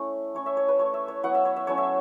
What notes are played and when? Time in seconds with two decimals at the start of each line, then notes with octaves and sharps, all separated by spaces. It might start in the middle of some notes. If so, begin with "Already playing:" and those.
Already playing: A3 C#4 E4
0.35 A3 C#4 E4 C#5
0.46 E5
0.57 C#5
0.68 B4
0.78 A3 E4 C#5
0.94 E5
1.08 C#5
1.23 F#3 B3 E4 F#5
1.35 E5
1.45 C#5
1.56 E5
1.67 F#3 A3 C#4 E4 C#5
1.78 E5